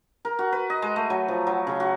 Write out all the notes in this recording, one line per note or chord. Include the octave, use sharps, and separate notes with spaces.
A#4
F#4
B4
D#5
G#3
A3
F#3
F3
F#3
C#3
F#4